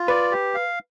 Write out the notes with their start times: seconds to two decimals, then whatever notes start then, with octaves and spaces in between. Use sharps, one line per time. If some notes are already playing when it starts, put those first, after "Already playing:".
Already playing: F4
0.08 B4 D5
0.31 G4
0.54 F5